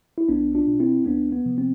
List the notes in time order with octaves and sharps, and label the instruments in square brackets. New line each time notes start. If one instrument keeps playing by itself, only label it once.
[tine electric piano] E4
B1 B3 D4
D4 F4
B2
C4 E4
D2 B3 D4
B3
C3 F3
C4